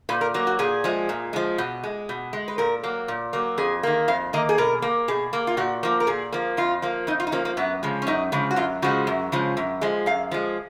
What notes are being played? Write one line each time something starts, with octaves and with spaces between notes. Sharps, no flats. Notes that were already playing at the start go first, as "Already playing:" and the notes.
A#2 B4
A#4
F#3 A#3
F#4
A#2 G#4
F3 G#3
A#2
F3 G#3
B2
G#3
B2
G#3
B4
A#2 A#4
F#3 A#3
A#2
F#3 A#3
F2 G#4
D#3 A#3
F2 F5
D#3 A#3 D#5
G#4
B2 A#4
A#3
B2 G#4
A#3
F4
A#2 F#4
F3 A#3
A#4
A#2 G#4
F3 A#3
F2 F4
F3 A#3
F2 D#4
F4
D#4
F3 A#3 C#4
A#3
F#2 B3
C#3 F3 G#3
C#4
F#2 D#4
C#3 F3 G#3
F#4
F#2 F4
C#3 F3 G#3 F#4
F#2
C#3 F3 G#3
F#2
F3 G#3
F#2 F5
F3 G#3